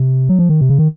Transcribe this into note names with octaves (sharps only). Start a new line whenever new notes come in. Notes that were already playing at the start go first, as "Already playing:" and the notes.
Already playing: C3
F#3
F3
D#3
C3
C#3
D#3